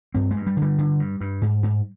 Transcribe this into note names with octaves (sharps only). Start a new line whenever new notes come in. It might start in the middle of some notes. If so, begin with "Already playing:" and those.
G2 C4
G#3
G2
G3
D3
G3
D3
G2
G2
G#2
G#2